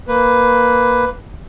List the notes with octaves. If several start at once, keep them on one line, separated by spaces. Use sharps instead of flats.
A#3 B4